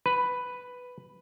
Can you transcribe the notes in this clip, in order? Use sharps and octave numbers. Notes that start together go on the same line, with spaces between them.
B4